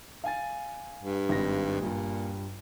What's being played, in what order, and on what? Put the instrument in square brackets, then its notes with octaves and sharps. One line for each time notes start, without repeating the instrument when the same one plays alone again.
[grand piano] F5 G#5 A6
[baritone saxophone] G2
[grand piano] G#1 A#6
[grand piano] G2 G3 [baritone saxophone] A#2